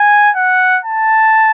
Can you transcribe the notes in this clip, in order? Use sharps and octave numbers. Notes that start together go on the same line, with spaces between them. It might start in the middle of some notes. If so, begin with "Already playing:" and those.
Already playing: G#5
F#5
A5